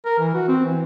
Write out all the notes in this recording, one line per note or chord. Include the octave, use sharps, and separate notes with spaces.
A#4
E3
F#4
C4
E3